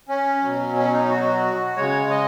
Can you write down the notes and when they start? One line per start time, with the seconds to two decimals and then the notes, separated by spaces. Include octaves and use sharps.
0.09 C#4
0.42 B2 F#3
0.76 C#4
0.92 D#4
1.09 F#4
1.76 C#3 G#3 C#5
2.10 D#5